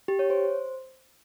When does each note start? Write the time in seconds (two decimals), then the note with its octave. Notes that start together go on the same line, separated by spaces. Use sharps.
0.08 G4
0.19 C#5
0.30 C5